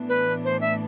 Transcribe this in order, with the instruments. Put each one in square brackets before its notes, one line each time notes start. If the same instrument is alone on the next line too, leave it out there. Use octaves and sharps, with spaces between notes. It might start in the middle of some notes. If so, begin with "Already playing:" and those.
Already playing: [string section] A2 E3 B3 D4
[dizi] B4
C5
E5